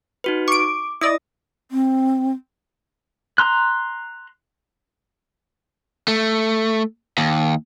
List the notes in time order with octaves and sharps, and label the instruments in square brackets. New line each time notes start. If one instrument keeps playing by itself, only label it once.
[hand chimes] D#4 F#4 B4
[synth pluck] C#6 D7 [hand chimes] D6
[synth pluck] E4 D5 D#5 [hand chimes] D#6 A#6
[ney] C4
[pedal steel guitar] A#5 C6 F#6
[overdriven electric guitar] A3
D#2